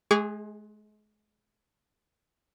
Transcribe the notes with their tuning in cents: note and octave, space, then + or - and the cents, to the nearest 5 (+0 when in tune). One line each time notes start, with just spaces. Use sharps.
G#3 +35 G#4 -20 C#6 +45